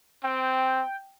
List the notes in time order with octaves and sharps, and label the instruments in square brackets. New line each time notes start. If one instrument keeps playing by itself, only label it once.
[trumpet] C4 [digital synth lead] G5